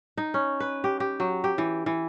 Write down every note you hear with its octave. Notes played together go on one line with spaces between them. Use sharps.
D#4
C#4
B4
G4
G4
F#3
G4
E3
E3